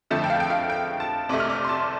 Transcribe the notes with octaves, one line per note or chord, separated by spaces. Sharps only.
F2 D3 F3 A3 A5
G5
F5
G5
F5
G5
A5
C2 C3 A3 D6
F6
D6
C6
A5